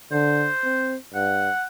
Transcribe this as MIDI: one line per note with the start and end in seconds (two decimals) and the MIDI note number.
0.12 0.49 50
0.12 0.94 72
0.64 0.96 60
1.14 1.49 43
1.14 1.64 78